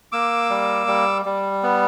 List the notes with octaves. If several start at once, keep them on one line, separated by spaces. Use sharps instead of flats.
A#3 D6 E6
G3
G3
G3
B3